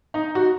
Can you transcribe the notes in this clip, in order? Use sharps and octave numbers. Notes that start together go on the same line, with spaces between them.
D#4
F#4